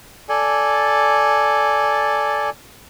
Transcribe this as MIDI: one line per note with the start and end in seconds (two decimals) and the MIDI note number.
0.29 2.50 69
0.29 2.50 74
0.29 2.50 80